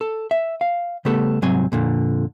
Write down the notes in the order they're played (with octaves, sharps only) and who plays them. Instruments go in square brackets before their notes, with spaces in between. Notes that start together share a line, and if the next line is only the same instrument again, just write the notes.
[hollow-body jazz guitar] A4
E5
F5
C#3 G3 A3 B3 A4
C2 G#2 F#3 C4 G#5
F2 A#2 D3